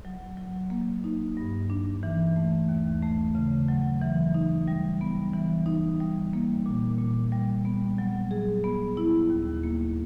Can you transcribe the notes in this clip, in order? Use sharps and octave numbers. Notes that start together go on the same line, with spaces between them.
F#3
F#3
A#3
D#4
G2
D4
E3
A3
D#2
A3
C#3
F#3
E3
D#4
G3
B3
E3
D#4
G3
A#3
A#2
A#2
G3
B3
F#3
G#4
B3
E4
D#2
A#3